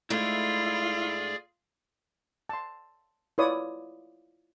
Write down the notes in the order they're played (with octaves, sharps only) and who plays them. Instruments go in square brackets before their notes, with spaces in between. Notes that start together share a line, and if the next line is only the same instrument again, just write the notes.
[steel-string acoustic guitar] G#2 A3 [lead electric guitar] E4 [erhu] F4 [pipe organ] G#4 D5
[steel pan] A5 C6
E4 F4 B4 C#5 D5 D#6